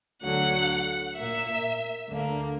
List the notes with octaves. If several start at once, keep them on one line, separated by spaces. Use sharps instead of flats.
D2 D3 F#3 F#5
A#2 A#3 E5
D2 D3 A#3